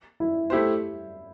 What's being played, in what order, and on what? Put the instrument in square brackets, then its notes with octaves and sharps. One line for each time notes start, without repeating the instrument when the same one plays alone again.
[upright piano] E4
[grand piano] A3 E4 G4 C5